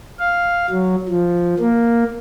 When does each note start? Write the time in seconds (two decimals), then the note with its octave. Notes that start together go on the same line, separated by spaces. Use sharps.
0.20 F5
0.70 F#3
1.08 F3
1.59 A#3